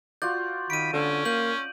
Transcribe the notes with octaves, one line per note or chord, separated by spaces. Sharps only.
F4 F#4 D5 G6
D#3 B5 D7 D#7
D3 C#4
A#3 G6 F#7